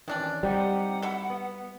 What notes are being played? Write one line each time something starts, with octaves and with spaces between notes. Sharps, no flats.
C3 D#3 E3 C#4 D4 D5
G3 C4 D#4 G4 F#5
F#3 E4
B3